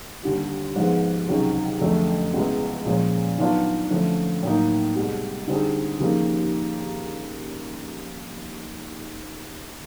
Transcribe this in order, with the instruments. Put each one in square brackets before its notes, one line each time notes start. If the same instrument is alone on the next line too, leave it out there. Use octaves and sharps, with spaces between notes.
[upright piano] D#2 D3 G3
G#2 F3 G#3 B3
C#2 C3 D#3 F#3
F2 D3 F#3 A3
C#2 B2 G#3 B3 E4
A#2 F3 G#3 C#4
D#3 F#3 B3 D4 F4
D3 F3 A3 C#4 E4
A2 F#3 A#3 D#4
C2 B2 G#3
D3 G3 C4 D#4 G#4
D#2 C#3 F3 A#3 D#4